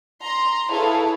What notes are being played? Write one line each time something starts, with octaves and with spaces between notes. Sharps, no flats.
A#5 C6
E4 G#4 A4 B4 C#5 F5